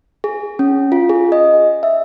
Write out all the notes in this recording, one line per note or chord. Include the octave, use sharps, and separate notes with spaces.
G#4
C#4
F4
G#4
D#5
E5